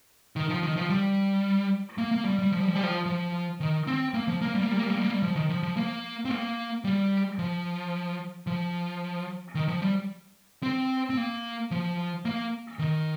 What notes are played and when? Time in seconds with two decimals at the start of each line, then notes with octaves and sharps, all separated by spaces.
0.36 D#3
0.49 F3
0.63 D#3
0.76 F3
0.90 G3
1.98 A#3
2.11 A#3
2.25 G3
2.39 G3
2.52 F3
2.60 G3
2.68 F3
2.75 G3
2.83 F3
3.06 F3
3.60 D#3
3.87 C4
4.14 A#3
4.28 F3
4.41 A#3
4.55 G3
4.62 A#3
4.69 G3
4.76 A#3
4.83 G3
4.90 A#3
4.97 G3
5.05 A#3
5.11 G3
5.23 F3
5.36 D#3
5.49 F3
5.63 F3
5.77 A#3
6.25 C4
6.30 A#3
6.84 G3
7.39 F3
8.47 F3
9.55 D#3
9.68 F3
9.82 G3
10.63 C4
11.10 C4
11.17 A#3
11.71 F3
12.25 A#3
12.79 D#3